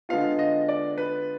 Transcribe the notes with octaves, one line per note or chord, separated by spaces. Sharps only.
D3 G#3 B3 F4 F5
D#5
D5
B4